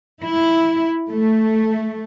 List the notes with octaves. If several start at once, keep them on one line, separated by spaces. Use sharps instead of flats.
E4
A3